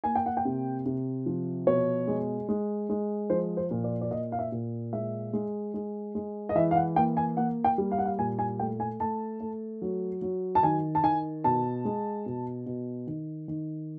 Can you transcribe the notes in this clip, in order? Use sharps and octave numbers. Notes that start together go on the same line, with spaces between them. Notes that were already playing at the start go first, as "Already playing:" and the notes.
A#3 G#5
G5
F#5
G5
C3
C3
F3
B2 C#5
G#3
G#3
G#3
F3 C5
C5
A#2
D5
D5
A#2 D#5
F5
E5
A#2
G#3 E5
G#3
G#3
G#3
D#5
E3 E5
F5
F#5
A#3 G5
G#5
A#3 F#5
G5
G3
F5
F#5
F5
A#2 G#5
G#5
A3 G5
G#5
A3 A5
A3
F#3
F#3
A5
D#3 G#5
A5
D#3 G#5
B2 A5
G#3
B2
B2
D#3
D#3